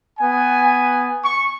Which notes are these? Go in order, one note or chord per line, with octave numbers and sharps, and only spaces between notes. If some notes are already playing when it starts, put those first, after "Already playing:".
B3 G#5
C#6